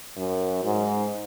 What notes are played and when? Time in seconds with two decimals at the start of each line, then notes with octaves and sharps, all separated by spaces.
0.16 F#2
0.64 G#2